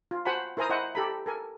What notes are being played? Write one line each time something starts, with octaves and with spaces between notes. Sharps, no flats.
F4
F#4 C5 F#5 G#5 A5 B5
E4 A#4 C5 G#5 A#5 D#6
E4 C5 D#5 F#5 G#5
G4 A4 A#5 B5
A4 A#4 G#5